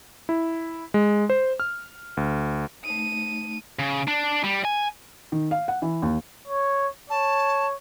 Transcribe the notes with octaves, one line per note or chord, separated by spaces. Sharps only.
E4
G#3
C5
F6
D2
A3 D#4 D#7
C#3
D4
G3
G#5
D#3
F5
F#5
E3
D#2
C#5
C#5 A5